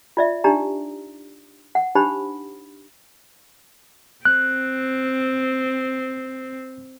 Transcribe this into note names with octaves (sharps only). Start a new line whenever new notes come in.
F4 D5 E5
D4 D#4 G4 D5 A#5
F#5
D4 D#4 G4 C5 B5
C4 F#6